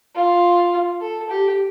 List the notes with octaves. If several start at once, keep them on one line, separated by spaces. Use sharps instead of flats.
F4
A4
G4